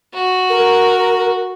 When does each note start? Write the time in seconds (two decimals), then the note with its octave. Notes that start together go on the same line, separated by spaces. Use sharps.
0.14 F#4
0.50 A#4